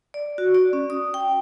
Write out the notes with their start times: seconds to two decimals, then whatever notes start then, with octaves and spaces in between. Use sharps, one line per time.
0.14 D5
0.38 F#4
0.55 D5
0.73 C#4
0.90 D#6
1.14 G5